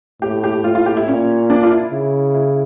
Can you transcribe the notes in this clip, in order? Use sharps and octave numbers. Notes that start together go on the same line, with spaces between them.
A2 G4
G4
A2 F4
F4
G4
E4
A#2 C#4
D4
F4
E4
C#3
E4